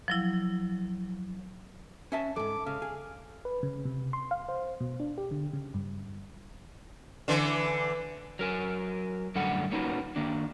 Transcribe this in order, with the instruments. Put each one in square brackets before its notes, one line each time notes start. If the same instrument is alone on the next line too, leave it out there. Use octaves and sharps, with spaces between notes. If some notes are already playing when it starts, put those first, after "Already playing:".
[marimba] F3 F#3 E4
[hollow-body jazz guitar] C#4 E5 A5
[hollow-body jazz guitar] E2 G#2 [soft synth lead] A4 [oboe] D6
[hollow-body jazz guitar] C#3 [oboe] F5
[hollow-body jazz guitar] G#4
[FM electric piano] B4
C#3
C3
C6
F5
C5
B2
D4
G4
D3
C#3
G2
[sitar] D3 E3
[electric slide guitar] F#3 A#4 G#5
F#2 A2 D3 G3 A4 F#5
A#3 C#4 D#4 F4 F#4 B4
D#3 A#3 D4